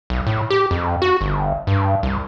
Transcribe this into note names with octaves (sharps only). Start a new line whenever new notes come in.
B1
A2
G4
F2
F#4
G1
G2
C2